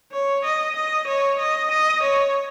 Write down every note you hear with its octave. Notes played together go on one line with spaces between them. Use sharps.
C#5
D#5
D#5
C#5
D#5
D#5
C#5